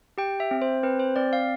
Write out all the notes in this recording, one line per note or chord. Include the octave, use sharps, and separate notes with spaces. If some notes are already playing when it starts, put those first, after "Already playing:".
G4 G5
E5
C4
C5
C4 B4
C5
C4 D5
F5